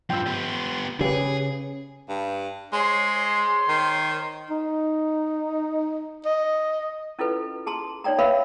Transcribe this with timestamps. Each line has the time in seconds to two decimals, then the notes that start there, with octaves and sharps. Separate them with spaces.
0.10 G2 F3 G5 E6
0.26 B3 G4
1.01 C#3 G4 G#4 B4
2.09 G2
2.73 G#3 C5 C#5 C6
3.69 D#3
4.50 D#4
6.25 D#5
7.19 C#4 E4 F4 A4 B4
7.67 G#4 A5 A#5 C6
8.04 D#4 C#5 D5 G5 A#5
8.19 A#4 B4 C#5 E5 F5 B5